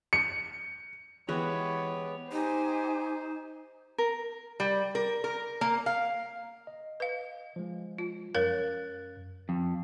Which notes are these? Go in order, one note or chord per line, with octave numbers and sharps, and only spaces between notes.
C#7
E3 G#3 B3 G4 B4 C#5 E5
D#4 G4 C5 G#5
A#4
G3
A#4
A#4
A#3
F5
D#5
B4 F5
F3 G#3
F4
F#2 A#4 C#5 F5 F#6 A6
F2